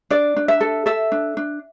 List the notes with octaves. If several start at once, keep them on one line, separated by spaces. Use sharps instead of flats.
D4 D5
D4
E5
A4
A4 E5
D4
D4